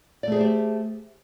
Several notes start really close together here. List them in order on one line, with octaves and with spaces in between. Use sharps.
D5 A3 G#4 C5 G4